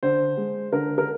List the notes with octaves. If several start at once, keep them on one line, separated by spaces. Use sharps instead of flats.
D3 C5
G#3
D3 A#4
A#4